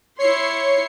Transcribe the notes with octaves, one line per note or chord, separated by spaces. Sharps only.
E4 C#5 C6 C7 C#7